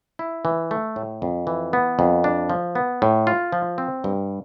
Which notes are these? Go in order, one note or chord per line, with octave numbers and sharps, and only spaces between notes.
E4
E3
A3
A2
F2
E3
B3
F2
D4
F3
B3
A2
F4
F3
C4
G2